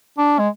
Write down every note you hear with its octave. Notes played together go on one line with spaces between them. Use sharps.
D4
G#3